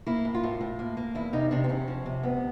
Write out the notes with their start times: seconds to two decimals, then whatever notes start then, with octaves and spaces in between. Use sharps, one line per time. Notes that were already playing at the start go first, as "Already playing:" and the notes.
0.07 A#3 E4
0.25 A2
0.34 F4
0.44 A2
0.61 A2
0.79 A#3
0.97 A#3
1.15 E2 E4
1.33 C3 D#4
1.51 C3 D4
1.64 C4
1.69 E2 C#4
1.88 F3
2.06 C3
2.23 D2 B3